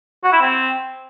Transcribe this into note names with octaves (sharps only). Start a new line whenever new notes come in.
F#4
E4
C4